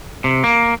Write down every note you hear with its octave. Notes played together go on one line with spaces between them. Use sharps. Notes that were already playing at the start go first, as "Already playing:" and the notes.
C3
A#3